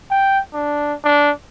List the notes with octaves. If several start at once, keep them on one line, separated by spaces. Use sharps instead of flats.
G5
D4
D4